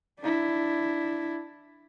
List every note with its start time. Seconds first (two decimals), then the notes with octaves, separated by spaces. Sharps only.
0.20 D4 E4